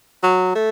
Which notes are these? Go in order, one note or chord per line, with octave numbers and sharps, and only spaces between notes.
F#3
A3